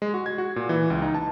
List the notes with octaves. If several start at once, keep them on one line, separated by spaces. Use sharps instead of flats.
G#3
F#4
G#6
F#4
A#2
E3
C#2
D#4
A5